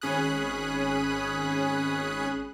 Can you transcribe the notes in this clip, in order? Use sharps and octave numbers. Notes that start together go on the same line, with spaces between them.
G#1 C#4 G#4 B5 D#6 F#6